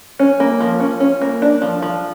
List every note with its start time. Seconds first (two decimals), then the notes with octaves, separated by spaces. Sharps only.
0.19 C#4
0.40 A#3
0.60 F3
0.80 C#4
1.00 C#4
1.21 A#3
1.42 D4
1.62 F3
1.82 F3